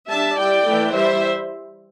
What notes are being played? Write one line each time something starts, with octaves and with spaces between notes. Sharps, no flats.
G3 D4 E5 A5
G3 E4 D5 G5
E3 A3 E4
G3 E4 C5 E5